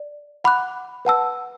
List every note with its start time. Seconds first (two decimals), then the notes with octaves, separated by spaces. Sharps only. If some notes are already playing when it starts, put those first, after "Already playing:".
Already playing: D5
0.44 F#5 B5 D6 F#6
1.05 B4 F#5 A5 E6